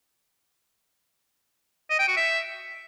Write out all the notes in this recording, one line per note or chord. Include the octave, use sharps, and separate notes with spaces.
D#5
G5
F#4
E5